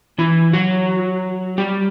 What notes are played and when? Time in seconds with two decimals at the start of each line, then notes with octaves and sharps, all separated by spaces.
0.18 E3 E4
0.53 F#3 F#4
1.58 G3 G4